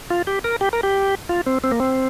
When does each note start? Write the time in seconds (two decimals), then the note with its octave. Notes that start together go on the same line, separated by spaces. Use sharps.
0.10 F4
0.27 G4
0.44 A#4
0.61 G4
0.73 A#4
0.83 G4
1.29 F4
1.47 C4
1.64 C4
1.71 A#3
1.80 C4